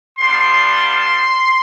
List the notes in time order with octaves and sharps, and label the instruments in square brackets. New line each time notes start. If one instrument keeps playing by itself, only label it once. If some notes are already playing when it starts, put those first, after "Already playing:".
[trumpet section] G3 B3 D4 F4 C6